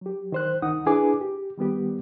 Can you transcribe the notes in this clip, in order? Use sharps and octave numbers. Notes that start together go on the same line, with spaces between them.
F#3 G4
D#3 C5 F#6
C2 D#3 D#4 F#5 D#6
D4 E4 G#4 B4 G#5 D6
G4
D#3 G3 B3 G4